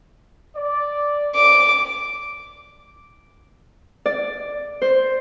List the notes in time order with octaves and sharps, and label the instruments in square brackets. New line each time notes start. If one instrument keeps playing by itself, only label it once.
[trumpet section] D5
[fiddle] D6
[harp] D5
C5